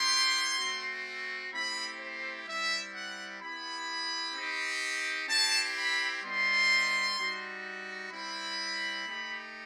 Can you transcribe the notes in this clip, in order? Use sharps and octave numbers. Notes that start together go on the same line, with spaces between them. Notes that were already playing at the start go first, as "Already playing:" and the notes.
Already playing: B3 E4 G4 C6
A3 C4 F#4
A3 C4 E4 G4 B5
C5
G3 C4 E4 E5
F#5
B3 E4 G4 B5
C4 D#4 G4
C4 E4 G4 A5
B5
G3 B3 D#4 C6
G3 D#4 F#4
G3 C4 E4 B5
A3 D#4 G4